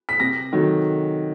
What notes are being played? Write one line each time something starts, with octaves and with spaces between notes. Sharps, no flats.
B6
C3 A#6
D#3 F#3 A3